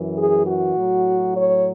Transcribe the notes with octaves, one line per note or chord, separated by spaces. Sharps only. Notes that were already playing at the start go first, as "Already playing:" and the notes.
Already playing: F#2 E3
G#4
F#4
A2 F#3
C#5